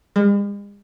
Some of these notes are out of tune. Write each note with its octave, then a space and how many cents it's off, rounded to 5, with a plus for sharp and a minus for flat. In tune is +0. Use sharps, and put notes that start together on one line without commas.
G#3 -45